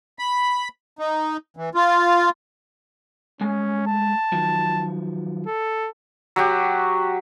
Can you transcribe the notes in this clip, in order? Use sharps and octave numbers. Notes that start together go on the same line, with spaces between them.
B5
D#4
E3
F4
G#3 A3 C#4 G#5
A5
D#3 F3 F#3
A4
F#3 F#4 G4